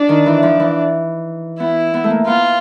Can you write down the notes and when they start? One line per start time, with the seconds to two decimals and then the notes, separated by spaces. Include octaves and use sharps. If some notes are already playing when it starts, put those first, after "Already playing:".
Already playing: D4
0.09 D#3
0.26 E3
0.43 F3
0.59 E3
1.60 B3 E4
1.94 B3
2.04 A3
2.10 A#3
2.27 B3 F4